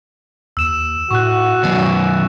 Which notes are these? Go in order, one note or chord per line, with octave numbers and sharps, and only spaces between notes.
D#2 E6 E7
A2 F#4 C#6 F#6
F#2 B2 D#3